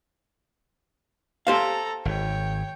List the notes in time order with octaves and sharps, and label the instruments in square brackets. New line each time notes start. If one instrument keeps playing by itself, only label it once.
[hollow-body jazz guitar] G4 C5 F5 [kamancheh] A4 A#5
[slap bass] G#1 [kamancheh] C#5 G5